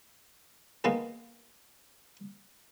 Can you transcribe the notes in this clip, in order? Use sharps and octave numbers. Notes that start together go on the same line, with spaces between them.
D#3 A#3 B3 F4 G#4 B4